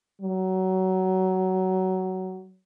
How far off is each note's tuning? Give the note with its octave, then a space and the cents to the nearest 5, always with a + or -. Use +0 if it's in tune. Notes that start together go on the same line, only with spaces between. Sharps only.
F#3 +20